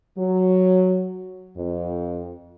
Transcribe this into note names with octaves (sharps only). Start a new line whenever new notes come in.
F#3
F2